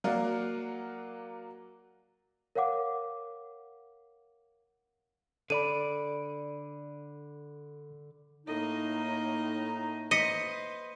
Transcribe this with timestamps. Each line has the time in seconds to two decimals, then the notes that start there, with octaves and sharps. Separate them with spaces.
0.04 F#3 A#3 A#4 D5 F5 F#5
2.55 A#4 C#5 F5 F#5 D6
5.50 D3 A4 D5 B5 D#7
8.46 A2 A#3 D#4 D#5
10.11 B4 C5 D#5 B6 C#7 D#7